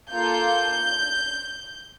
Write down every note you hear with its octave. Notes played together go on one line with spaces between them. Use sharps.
A#3 F4 A4 G6